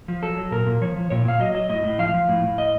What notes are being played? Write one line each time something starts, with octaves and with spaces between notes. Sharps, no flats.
F3
F#3 A4
F#3
A#2 A#4
A#2
F3 C#5
F3
A#2 C#5
A#2 F5
F#3 D#5
F#3 D#5
A2 D#5
A2
F3 F5
F3
A2
A2
D#5